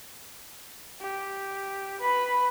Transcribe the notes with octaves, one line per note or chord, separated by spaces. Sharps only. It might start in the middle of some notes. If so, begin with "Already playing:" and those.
G4
B4 B5